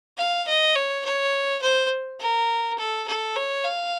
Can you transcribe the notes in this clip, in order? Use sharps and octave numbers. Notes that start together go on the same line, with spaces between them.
F5
D#5
C#5
C#5
C5
A#4
A4
A4
C#5
F5